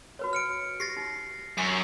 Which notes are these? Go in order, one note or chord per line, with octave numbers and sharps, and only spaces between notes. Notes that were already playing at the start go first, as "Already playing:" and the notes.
F#4 B4 C#5
F6 C#7 D7
G4 A6 A#6 C7
D#4
F#2 G#5 C#6 C7